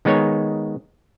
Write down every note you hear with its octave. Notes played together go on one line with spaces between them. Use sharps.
D#3 G#3 B3 D#4 C#5 G#5